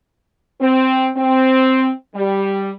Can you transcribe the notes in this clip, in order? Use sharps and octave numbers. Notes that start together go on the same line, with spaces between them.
C4
C4
G3